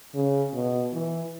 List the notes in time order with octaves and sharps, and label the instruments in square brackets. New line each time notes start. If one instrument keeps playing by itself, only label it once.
[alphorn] C#3
B2
E3